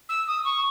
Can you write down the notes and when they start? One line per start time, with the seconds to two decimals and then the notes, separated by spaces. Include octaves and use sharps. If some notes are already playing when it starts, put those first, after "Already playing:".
0.09 E6
0.27 D#6
0.45 C#6